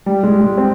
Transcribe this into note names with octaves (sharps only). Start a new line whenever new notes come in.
G3
G#3
G#3
C4